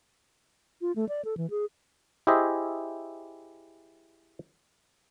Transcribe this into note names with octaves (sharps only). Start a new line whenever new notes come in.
F4
A3
D5
A4
E3
G#4
E4 G4 G#4 C5 D#5 E5